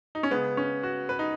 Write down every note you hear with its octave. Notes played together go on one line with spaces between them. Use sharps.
D#4
C#4
C#3 G#3 B3
C#4
F#4
B4
D#4